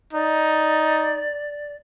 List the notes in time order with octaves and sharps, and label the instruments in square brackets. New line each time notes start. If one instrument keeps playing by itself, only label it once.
[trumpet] D#4 [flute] D5